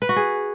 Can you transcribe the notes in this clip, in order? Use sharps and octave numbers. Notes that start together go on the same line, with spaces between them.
B4
F#4
G#4